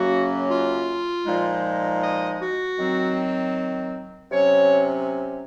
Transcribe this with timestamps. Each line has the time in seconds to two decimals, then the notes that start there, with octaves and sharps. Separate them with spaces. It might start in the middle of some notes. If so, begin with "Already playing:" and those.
Already playing: F#2 C#3 F#3 A#3 C#4 F#4
0.48 F4
1.24 A#2 F3 G#3 D#4
2.01 D#5
2.39 F#4
2.78 D#3 F#3 C4
4.30 C3 F#3 C#4 C#5